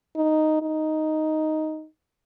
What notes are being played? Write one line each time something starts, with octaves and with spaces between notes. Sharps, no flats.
D#4
D#4